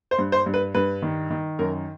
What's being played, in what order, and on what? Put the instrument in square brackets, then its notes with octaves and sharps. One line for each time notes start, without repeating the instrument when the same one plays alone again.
[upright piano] C5
G2
C5
G2
B4
G2 B4
D#3
D#3
F#2 A#4